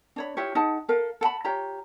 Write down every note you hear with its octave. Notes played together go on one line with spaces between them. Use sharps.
D4 C#5 B5
E4 F4 G4 C#5
D#4 G#4 F#5 A5
A4 A#4 F5
A4 F#5 A5 B5
F4 G4 C#5 A#5